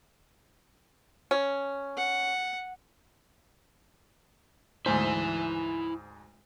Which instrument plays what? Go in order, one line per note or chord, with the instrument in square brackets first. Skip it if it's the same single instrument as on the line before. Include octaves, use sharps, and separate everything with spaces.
[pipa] C#4
[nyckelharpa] F#5
[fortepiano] D2 G#2 C5 [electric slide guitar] E4 G#5